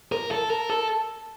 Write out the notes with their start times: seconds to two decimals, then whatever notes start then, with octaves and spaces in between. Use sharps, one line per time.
0.12 A#4
0.31 A4
0.50 A#4
0.70 A4